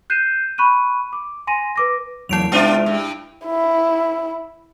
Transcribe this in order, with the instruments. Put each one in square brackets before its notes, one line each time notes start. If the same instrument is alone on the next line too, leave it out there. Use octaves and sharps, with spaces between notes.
[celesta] F#6 G6 C7 D#7 E7
B5 C#6 F#6 D#7
D6
G#5 C6 A#6 D#7
B4 D6 A#6
[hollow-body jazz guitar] E2 F#3 A#3 [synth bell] E4 D7 F7
[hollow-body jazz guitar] G#3 D5 E5 [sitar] B3 D4 F4
[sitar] G2
[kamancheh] E4